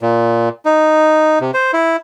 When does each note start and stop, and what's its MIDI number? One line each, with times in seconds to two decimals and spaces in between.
0.01 0.49 46
0.65 1.39 63
1.41 1.51 48
1.54 1.71 72
1.73 1.96 64